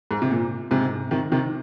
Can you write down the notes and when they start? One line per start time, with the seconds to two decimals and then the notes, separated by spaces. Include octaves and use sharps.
0.11 G#2
0.22 C3
0.30 A#2
0.71 G#2 C3
1.11 C3 D#3
1.32 C3 D#3